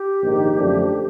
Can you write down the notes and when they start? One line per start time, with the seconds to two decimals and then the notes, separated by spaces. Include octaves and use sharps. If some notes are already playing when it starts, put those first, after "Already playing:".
Already playing: G4
0.23 A#1 G#2 D#3
0.57 F#2 D3 F3 A3 D4